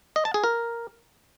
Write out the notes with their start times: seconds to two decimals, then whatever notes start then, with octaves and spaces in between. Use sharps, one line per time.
0.16 D#5
0.25 A5
0.34 G#4
0.44 A#4